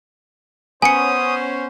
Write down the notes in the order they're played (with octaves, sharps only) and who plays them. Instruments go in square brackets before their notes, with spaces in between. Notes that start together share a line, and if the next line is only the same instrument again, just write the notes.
[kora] B3 [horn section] C#4 C5 [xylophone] G#5 C#7 [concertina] D#6